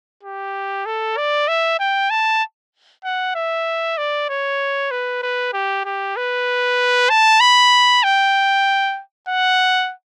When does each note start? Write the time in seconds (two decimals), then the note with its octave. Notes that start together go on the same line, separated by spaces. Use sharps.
0.23 G4
0.86 A4
1.17 D5
1.48 E5
1.80 G5
2.10 A5
3.04 F#5
3.35 E5
3.98 D5
4.29 C#5
4.91 B4
5.23 B4
5.53 G4
5.85 G4
6.16 B4
7.10 A5
7.41 B5
8.04 G5
9.28 F#5